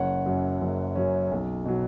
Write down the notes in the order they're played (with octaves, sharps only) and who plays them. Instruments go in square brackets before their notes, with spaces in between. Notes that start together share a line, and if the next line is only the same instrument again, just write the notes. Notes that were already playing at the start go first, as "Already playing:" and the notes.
Already playing: [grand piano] F#1 C#5 F#5
F#2 F#3 C#4
F#1
F#2 F#3 C#4
B1
B2 F#3